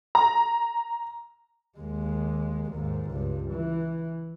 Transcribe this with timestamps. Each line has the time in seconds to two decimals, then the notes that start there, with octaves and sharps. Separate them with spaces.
0.15 A#5
1.78 D#2 G#3
2.71 D#2 G#2
3.10 C#2 G2
3.51 E3